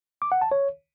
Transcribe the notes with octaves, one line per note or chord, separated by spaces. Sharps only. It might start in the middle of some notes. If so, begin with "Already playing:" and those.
D6
F#5
A5
C#5